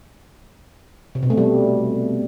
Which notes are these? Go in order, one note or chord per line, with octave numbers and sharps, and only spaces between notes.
C3
B2
A3
G3